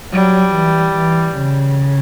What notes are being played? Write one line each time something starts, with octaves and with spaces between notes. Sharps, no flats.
F#3 G3
E3
E3
C#3